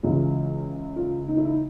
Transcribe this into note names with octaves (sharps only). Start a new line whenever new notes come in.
C#2 C#3 E3 F4
F4
D#4
E4
D#4